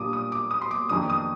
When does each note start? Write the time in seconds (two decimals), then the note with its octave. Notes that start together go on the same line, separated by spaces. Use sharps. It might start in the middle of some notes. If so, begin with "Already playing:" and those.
Already playing: A#2 G3 D4 F4 D6 D#6
0.13 D#6
0.32 D6
0.51 D#6
0.61 C6
0.71 D6
0.89 F2 D#3 A#3 D4 D#6
1.10 D#6